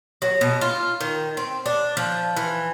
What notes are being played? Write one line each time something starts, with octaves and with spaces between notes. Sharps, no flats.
F#3
B2
F4
D#3
C4
D4
F3
E3